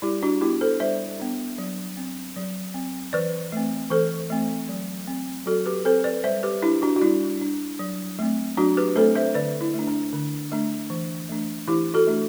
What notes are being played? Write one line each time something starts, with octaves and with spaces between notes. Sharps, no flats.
G3 E4 G4
D4 F#4
B3 D4 E4 G4
A4 C5
G3 C5 E5
B3 D4
F#3
C4
F#3
C4
E3 B4 D5
A3 C4
E3 A4 C5
A3 C4
F#3
C4
F#3 F#4 A4
G4 B4
C4 A4 C5
B4 D5
G3 C5 E5
G4 B4
D4 E4 G4
D4 F#4
F#4
G3 E4
D4
F#3
A3 C4
F#3 D4 F#4
G4 B4
A3 C4 A4 C5
C5 E5
D3 B4 D5
E4
A3 D4
D4
D3
A3 D4
E3
A3 D4
E3 E4 G4
F#4 A4
A3 D4